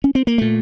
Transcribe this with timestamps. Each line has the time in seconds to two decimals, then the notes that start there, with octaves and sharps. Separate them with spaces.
0.04 C#4
0.15 C4
0.27 A#3
0.38 A#2 A3